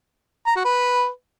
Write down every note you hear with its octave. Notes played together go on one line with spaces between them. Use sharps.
A#5
F#4
B4